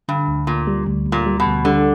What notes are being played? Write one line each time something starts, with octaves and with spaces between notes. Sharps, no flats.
G2 D3
D2
D2 A#2
G3
D2
D2
A#2
G3
B2
D2
D3 G3